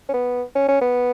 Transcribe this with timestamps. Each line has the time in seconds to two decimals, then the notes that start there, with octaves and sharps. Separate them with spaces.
0.09 C#4
0.14 B3
0.55 C#4
0.68 C#4
0.81 B3